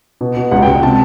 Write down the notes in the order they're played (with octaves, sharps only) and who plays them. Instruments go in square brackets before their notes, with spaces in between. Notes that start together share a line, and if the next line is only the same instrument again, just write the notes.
[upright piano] B2
B2
C#2 F#5
G5
C#2
C3 A5